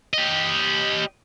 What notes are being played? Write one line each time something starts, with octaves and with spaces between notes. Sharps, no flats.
G4 D#5